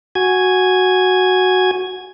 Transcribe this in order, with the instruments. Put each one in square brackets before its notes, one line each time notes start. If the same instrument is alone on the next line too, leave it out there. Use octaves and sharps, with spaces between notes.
[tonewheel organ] F#4 G#5 G#6